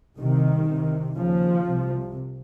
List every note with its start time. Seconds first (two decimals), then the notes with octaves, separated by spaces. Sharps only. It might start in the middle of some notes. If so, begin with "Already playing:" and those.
0.17 C2 C3 D#3
0.68 C2 C3
1.18 D#2 C#3 F3
1.69 C2 C3